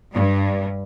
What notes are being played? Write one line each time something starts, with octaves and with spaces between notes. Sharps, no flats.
G2